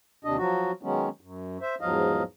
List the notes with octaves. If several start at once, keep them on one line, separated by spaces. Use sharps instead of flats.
D#2 C3 D4 D#5
F3 F#3 F#4
D#3 F#3 G#3 B3 C#4
F#2
C5 E5
E2 G#2 F3 F#3 D#5 F5